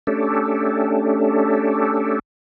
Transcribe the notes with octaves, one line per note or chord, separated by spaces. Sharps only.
A3 C#4 D4 G4 A4